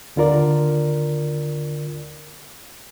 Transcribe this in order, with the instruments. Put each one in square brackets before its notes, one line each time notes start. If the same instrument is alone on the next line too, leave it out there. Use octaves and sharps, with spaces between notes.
[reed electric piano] D#2 D3 F4 A#4 D5